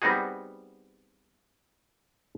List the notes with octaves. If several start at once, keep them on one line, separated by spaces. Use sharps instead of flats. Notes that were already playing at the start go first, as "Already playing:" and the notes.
G3 B3 C4 D#4 F#4 G#4